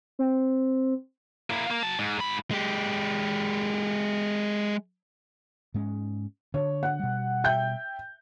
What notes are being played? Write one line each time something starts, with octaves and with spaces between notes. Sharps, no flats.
C4
A#3 E4
A#3
F#3 A5
G#2
G#2 B5
G#3 G4
G#2 G#3 C#4
D3 D4 C#5
F#5
B2 G3
E5 G5 G6